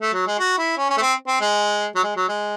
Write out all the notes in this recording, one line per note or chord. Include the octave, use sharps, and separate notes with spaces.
A3
F#3
G#3
F#4
E4
C#4
C#4
A3
C4
C4
G#3
F#3
G#3
F#3
G#3